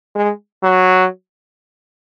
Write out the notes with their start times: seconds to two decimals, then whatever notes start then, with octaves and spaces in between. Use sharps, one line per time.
0.16 G#3
0.63 F#3